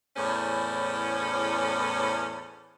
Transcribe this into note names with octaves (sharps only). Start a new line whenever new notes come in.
E2 A2 C#4 G#4 C5